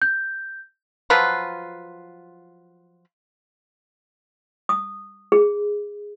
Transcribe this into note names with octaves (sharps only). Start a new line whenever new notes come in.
G6
F3 F#3 F4 B4
D#6
G#4